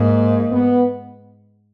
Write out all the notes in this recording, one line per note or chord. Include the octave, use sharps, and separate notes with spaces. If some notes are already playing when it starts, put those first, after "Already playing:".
Already playing: G#2 A#3
B3